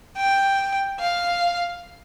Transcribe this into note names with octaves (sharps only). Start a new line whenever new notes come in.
G5
F5